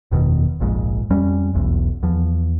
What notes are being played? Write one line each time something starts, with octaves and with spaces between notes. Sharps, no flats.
F#1 E2 B2 D#3
F1 A#1 F2 G#2
F2 G3 C#4
E1 B1 E2
E2 F3